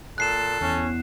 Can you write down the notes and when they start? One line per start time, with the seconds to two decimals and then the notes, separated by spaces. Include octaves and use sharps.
0.18 A#2 A4 F#6 C7 E7
0.61 E2 C#4